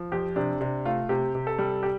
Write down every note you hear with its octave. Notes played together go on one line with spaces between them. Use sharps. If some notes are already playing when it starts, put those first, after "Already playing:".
Already playing: F3
F2 G4
C3 D4
C3 D4
A3 F4
C3 G4
C3
A4
G3
G4